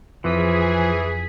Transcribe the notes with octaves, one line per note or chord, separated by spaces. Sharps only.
F2 E3 F3 G#4 D#6 B6